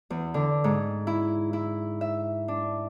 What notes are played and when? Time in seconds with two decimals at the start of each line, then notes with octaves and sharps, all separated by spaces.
0.10 E2
0.34 D3
0.64 G#2
1.07 E4
1.53 E4
2.01 E5
2.48 D4